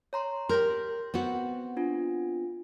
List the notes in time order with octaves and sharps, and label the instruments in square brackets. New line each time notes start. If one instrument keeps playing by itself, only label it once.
[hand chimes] C#5 A#5 C6
[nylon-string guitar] G4 A#4 [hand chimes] C6 G6 A#6
[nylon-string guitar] B3 C4 F#4
[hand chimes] D4 F4